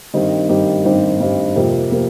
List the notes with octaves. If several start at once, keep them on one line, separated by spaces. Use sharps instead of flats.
G2 D#3 C4 D#4 G4
G2 D#3 C4 D#4 G4
G2 D#3 C4 D#4 G4
G2 D#3 C4 D#4 G4
F2 C3 F3 A#3
C3 F3 A#3